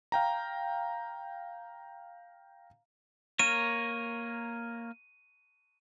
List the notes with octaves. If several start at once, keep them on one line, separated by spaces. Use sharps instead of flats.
F5 G5 A#5
A#3 A#4 C#5 D#7